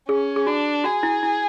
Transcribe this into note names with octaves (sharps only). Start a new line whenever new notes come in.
C#4 G#4
G#4
D4 F#4
F#4 G#4
E4
E4